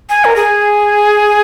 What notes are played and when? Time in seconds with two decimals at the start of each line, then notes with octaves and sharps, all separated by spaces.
0.10 G#5
0.25 A#4
0.36 G#4